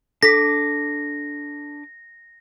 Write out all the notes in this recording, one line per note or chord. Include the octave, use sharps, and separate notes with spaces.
D4 A4 D6 A#6 B6